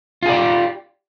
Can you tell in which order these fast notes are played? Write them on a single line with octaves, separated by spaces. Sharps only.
F4 G#4 D5 G4